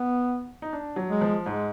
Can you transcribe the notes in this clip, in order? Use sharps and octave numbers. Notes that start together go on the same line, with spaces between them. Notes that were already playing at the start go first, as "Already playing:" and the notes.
Already playing: B3
D#4
D4
F#3
G#3
F3
G#2 G#3